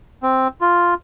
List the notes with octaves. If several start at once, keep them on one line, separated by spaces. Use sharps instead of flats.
C4
F4